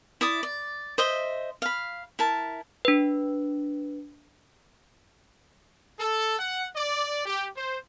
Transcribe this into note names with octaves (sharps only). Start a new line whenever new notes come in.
E4 D5 D#6
D5
C5 D#5 E5
F5 B5
E4 A#4 A5
D4 B4
A4
F#5
D5
G4
C5